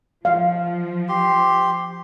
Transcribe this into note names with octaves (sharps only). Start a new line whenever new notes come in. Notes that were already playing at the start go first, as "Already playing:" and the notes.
F3 F5
G4 C6